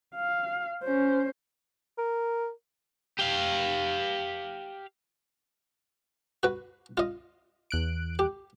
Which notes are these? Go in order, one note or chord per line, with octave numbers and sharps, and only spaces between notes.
F5
C#4 C5
A#4
G4 F5
F#4 B4
F4 D#5
E2 F#6 D7
G4